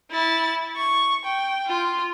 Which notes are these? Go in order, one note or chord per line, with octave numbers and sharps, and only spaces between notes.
E4 A6
C#6
G5
F4